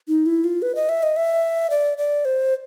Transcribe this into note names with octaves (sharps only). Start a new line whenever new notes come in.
D#4
E4
F4
B4
D#5
E5
D#5
E5
D5
D5
C5